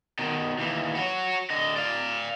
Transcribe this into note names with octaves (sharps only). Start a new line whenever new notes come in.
B2 D#3
D#2 E3
F#4 C#5
D3 D#5
D5 F5